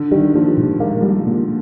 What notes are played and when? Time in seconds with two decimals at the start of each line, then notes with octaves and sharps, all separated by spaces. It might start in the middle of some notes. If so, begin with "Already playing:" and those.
Already playing: D3
0.11 D#3 G3
0.34 A#2 F3
0.57 A#2 G3
0.80 G#3 A#3
1.03 G3
1.27 A#2